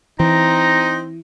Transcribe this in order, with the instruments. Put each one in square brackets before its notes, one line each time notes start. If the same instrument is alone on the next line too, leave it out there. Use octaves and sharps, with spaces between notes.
[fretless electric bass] E3 [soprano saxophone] C4 [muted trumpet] D#4 [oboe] A#5